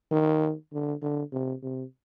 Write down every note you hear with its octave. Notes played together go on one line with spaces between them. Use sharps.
D#3
D3
D3
C3
C3